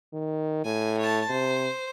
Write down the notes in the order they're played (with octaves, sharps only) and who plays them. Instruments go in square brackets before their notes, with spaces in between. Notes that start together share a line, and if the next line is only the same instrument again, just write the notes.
[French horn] D#3
[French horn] A2 [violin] G#5
[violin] C#5 A5
[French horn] C3 [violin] C5